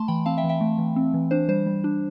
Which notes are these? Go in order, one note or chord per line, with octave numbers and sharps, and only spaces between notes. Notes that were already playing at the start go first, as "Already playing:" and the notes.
Already playing: A3 A5 C6
E3 G5 B5
C4 F5 A5
E5 G5
E3
E5 G5
A3
E3
C4
E3
D4 C5
G3 C5
G3
D4